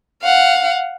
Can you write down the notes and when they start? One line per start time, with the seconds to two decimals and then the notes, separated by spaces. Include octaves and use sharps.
0.22 F5 F#5